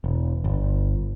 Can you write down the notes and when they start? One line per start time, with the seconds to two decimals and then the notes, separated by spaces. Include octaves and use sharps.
0.04 E1
0.44 G1